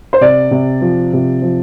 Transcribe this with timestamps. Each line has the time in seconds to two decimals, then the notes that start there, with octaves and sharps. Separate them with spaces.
0.13 C5
0.21 C3 D5
0.51 C3
0.81 F3
1.13 C3
1.42 F3